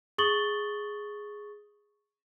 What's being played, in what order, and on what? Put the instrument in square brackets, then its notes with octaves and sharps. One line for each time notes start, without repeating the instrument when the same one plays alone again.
[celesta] G#4 C#6 D#6 A6 F#7 G7